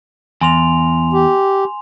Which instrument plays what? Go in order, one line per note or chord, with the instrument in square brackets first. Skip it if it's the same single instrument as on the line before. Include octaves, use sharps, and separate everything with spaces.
[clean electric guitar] E2 [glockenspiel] G#5 C6 F7
[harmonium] G4